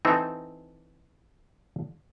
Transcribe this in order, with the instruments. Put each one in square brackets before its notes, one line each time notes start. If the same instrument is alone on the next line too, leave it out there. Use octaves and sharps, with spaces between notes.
[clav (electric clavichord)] E3 C4 D#4 A4